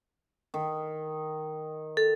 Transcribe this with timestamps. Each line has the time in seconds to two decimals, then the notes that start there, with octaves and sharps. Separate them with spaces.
0.54 D#3
1.97 A4